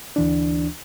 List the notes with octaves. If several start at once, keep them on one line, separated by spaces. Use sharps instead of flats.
D2 E3 D4